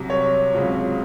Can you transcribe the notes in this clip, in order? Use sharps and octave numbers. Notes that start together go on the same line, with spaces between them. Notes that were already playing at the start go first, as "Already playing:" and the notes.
Already playing: C2 C3 F#3
C#5
C#2 C#3 F#3 C4 F4